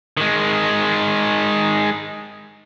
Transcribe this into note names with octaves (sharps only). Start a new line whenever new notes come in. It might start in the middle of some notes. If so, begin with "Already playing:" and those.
D#3 G#3